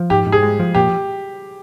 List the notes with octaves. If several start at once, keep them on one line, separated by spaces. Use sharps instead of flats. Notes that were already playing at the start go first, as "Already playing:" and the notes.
Already playing: F3
G#2 G4
G#2
G#4
G#3
F3
A#2 G4